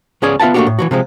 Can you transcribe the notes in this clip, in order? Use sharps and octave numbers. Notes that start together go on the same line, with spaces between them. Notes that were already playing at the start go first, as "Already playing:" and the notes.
C#2 B3 C#4 G#4 D5 G#5
B3 F4 E5 F#5 A5
A3 A#3 C#4 D4 F#4 G4
A2
E3 F#3 F#4
C3 F3 G#3